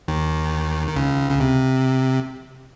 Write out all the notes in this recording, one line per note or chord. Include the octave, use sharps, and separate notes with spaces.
D#2 D#3
D#3
C#2 C#3
C#3
C3